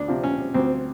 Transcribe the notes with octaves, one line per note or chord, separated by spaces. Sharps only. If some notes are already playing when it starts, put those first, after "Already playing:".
Already playing: D2 D4
C3 F3
C#4
D2 C4